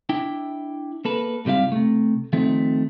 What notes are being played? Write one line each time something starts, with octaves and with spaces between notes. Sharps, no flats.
D4 E4 G5
A#3 A4 B4
G#2 C3 G3 E4 F5
C3 A3
D#3 F3 A3 C4